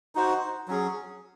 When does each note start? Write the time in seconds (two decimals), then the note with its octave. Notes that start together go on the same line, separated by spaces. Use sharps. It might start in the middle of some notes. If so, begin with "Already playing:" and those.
0.15 D#4 F#4 C5
0.68 F#3 C#4 G#4